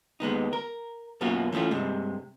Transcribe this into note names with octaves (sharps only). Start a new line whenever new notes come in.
D#2 G#3 B3 D#4
A#4
F#2 B2 A#3 C#4 F4 F#4
E3 F3 A3 C#4 F4
G2 C3 G#3